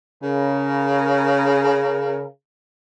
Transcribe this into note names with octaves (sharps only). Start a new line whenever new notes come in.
C#3 A#4